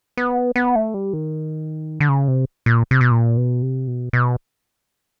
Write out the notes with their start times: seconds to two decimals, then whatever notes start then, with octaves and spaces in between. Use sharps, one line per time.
0.17 B3
0.56 B3
0.75 A3
0.94 G3
1.13 D#3
2.00 D3
2.09 C#3
2.28 C3
2.66 A#2
2.91 C3
3.01 B2
3.11 A#2
3.37 B2
3.62 C3
3.87 B2
4.13 B2